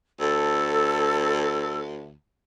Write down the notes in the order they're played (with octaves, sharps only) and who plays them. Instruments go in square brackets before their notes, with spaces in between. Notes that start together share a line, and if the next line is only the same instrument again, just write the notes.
[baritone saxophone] D2 [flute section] A4 E6